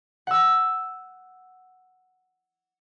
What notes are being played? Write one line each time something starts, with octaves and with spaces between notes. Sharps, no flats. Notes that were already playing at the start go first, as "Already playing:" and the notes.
F#5 E6